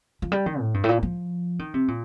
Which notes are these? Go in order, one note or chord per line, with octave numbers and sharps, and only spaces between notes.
F3
G3
D#3
A2
G2
A2
A#2
F3
D#3
C3
A#2